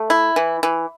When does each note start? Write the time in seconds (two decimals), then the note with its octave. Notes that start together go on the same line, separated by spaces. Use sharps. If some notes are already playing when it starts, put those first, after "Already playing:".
Already playing: A3
0.10 E4
0.36 E3
0.63 E3